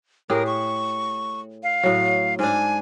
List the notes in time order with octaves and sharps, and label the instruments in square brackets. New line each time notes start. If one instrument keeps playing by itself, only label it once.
[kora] A2 G4 G#4 [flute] A#4
[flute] C#6
F5
[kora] A2 F#3
[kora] G#2 D4 [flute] G#5